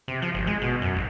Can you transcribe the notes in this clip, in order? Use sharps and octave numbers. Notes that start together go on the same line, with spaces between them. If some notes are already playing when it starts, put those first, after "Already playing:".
C3
F3
G#1
G#3
B2
F#2
A1